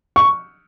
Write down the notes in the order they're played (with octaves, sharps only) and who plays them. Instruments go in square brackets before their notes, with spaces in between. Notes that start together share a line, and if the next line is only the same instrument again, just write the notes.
[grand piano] C#6